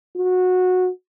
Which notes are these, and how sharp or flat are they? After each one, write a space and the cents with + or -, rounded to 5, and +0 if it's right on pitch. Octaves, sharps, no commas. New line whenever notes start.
F#4 -15